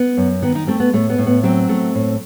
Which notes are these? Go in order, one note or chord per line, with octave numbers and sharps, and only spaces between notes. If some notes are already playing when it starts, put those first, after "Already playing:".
Already playing: B3
F#2
D#3 B3
D#4
A3 C4
B3
A2 A3
B3
A2
B3
F#3 C4
A3
A2